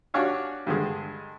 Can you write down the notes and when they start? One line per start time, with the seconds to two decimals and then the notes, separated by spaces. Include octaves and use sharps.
0.14 D4 F#4 G4 C#5 F5 G#5
0.67 G2 D3 G#3